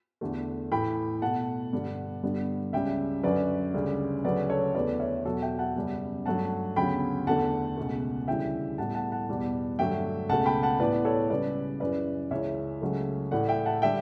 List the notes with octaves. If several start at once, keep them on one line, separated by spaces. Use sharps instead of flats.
E2 D3 A3
A2 E3 A3 G5 B5
B2 A3 F#5 A5
G2 D3 G3 B3
G2 D3 G3 B3
C#2 C#3 G3 E5 G5
F#2 D3 F#3 B4 D5
D2 C#3 G3
D2 C#3 F#3 B4 D5
A4 C#5
E2 D3 A3 B4 D5
C#5 E5
E2 B2 F#3 F#4 A4
E5 G5
F#5 A5
F#2 C#3 G3 B3
G2 F#3 A3 F#5 A5
D2 C#3 F#3 B3 G5 B5
E2 D3 A3 F#5 A5
C#2 B2 A3
D2 C#3 E3 G3 E5 G5
A2 G3 B3 F#5 A5
F#5 A5
F#5 A5
E2 B2 G3
G2 D3 F#3 A3 E5 G5
C#2 B2 A3 F#5 A5
G5 B5
F#5 A5
A2 E3 B3 B4 D5
A4 C#5
C#2 C#3 G3 B4 D5
F#2 C#3 E3 B4 D5
C#2 C#3 E3 C#5 E5
C#2 C#3 F#3 A3
A2 E3 A3 D5 F#5
E5 G5
F#5 A5
D3 G3 E5 G5